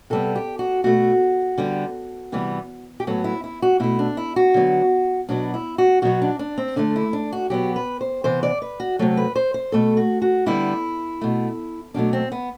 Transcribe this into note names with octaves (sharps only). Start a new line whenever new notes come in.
C3 G3 B3 A4
G4
F#4
B2 A3 F#4
D3 G3 B3
C3 E3 G3 B3
G4
A2 F#3 B3 A4
E4
E4
F#4
B2 A3 E4
D4
E4
F#4
D3 F#3 B3
B2 F#3 B3 D4
E4
F#4
B2 F#3 B3 F#4
D4
D4
C4
D3 A3 D4
E4
D4
F#4
B2 F#3 B3 G4
B4
C5
C3 E3 B3 C5
D5
B4
F#4
C3 F#3 A3 A4
B4
C5
C5
B2 A3 A4
F#4
F#4
D3 G3 B3 E4
B2 A3
B2 F#3 A3 D4
C4
B3